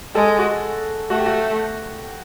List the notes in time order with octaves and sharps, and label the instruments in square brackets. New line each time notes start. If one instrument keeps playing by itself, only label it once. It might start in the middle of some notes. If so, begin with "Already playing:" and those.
[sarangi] G#3 [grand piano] A4
[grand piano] F#4
[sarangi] A3 [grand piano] F#4
[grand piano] G4
F#4